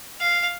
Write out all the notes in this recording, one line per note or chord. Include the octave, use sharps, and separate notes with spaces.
F5